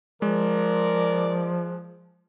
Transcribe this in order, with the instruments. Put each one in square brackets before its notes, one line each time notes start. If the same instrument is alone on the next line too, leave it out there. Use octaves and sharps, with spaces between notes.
[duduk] F3 [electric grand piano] G#3 [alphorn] A#4 [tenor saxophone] D5